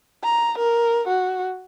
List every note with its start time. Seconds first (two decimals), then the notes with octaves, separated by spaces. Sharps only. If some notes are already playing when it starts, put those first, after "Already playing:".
0.23 A#5
0.58 A#4
1.08 F#4